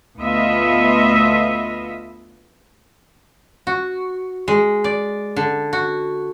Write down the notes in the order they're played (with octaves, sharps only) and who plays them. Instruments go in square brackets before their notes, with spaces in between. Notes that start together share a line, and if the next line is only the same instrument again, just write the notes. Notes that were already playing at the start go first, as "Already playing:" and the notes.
[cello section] D2 B3 F4 D#5 E5
[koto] F#4
G#3
D5
D3
F#4